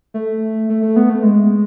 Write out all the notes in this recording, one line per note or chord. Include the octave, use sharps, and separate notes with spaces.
A3
A3
A3
B3
A3
G#3